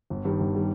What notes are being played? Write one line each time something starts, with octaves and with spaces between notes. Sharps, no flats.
G1
G2 D#3 G3
G1
D#3 G3